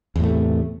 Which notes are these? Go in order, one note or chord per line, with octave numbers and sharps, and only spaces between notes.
E2 A2 C3 A3